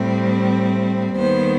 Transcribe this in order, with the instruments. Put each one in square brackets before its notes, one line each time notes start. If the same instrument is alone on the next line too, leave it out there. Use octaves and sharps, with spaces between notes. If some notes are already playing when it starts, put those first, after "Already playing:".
Already playing: [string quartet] A2 G3 C4
D#2 D#3 G3 B3 C5